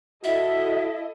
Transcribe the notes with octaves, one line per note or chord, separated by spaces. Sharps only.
E4 F#4 A4 D#5 E5